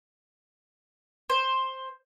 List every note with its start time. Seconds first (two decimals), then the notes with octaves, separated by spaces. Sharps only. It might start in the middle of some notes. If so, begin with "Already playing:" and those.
1.30 C5